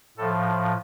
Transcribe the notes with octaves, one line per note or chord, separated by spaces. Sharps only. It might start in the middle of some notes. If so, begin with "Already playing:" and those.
A2 F3 A4